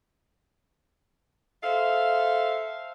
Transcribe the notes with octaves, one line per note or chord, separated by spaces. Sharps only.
A4 C5 E5 F5